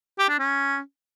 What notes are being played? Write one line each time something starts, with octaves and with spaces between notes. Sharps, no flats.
G4
D4
C#4